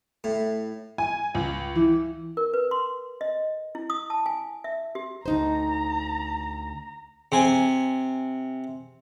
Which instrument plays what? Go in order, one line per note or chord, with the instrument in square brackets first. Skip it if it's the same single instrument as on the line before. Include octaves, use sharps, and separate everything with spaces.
[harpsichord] A2
[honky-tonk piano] G#5
C#2
E3
[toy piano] A#4
B4
C6
D#5
E4
D#6
A5
G#5
E5
G4
[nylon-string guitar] D2 D#4 C5 [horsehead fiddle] A#5
[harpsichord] C3 G#5